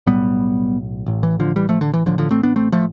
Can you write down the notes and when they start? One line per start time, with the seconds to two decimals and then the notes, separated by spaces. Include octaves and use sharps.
0.07 B1 A2 G3 B3
1.06 A1 A2
1.23 E3
1.40 D3 F3
1.56 E3 G3
1.69 F3 A3
1.81 D3
1.93 E3
2.06 A1 A2 D3 F3
2.18 D3 F3
2.31 A3 C4
2.43 B3 D4
2.56 A3 C4
2.72 F3 A3